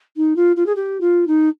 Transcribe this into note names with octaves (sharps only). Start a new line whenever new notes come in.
D#4
F4
F4
G#4
G4
F4
D#4